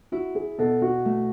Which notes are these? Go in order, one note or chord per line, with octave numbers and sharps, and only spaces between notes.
E4 F#4
G#4
B2 A4
F#4
A3